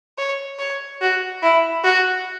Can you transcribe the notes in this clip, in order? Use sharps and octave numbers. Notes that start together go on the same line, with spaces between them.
C#5
C#5
F#4
E4
F#4